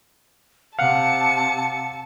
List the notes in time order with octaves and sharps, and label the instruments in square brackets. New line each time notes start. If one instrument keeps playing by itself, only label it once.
[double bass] C3 [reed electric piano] F5 F#5 [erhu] A5 [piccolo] C#7